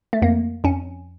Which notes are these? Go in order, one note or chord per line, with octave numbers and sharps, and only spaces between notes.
A3
F2 A#3
F2 C#4